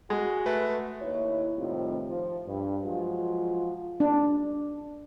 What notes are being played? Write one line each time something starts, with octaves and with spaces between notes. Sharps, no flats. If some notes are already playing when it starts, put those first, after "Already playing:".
G#3 F#4
A3 B4
D#2 E4 C#5
A2 C3 D#3 G3 C4 F4
F3
G2
F3 F#3 G#3 F4
D4